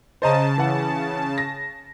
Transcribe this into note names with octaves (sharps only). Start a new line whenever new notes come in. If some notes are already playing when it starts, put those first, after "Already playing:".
C#3 C5 D#5 A5 A#5
E3 F#5
A#6